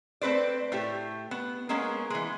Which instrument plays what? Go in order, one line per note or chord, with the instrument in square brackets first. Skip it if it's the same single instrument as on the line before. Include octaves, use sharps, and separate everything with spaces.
[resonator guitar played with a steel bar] A3 C4 B4 C5 D5
A2 A3 G4
B3
G#3 A#3 B3 C#4 G#4
E3 G#3